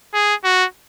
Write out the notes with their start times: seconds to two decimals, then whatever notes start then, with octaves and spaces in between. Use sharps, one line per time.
0.14 G#4
0.44 F#4